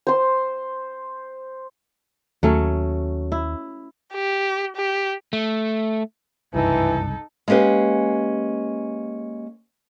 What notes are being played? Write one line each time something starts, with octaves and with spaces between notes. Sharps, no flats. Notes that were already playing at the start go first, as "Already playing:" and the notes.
C5 C6
D#2 F#3 A3 C#4
E4
G4
G4
A3
F#1 C2 G2 E3 D#4 A4
G#3 A#3 C#4 G4 B4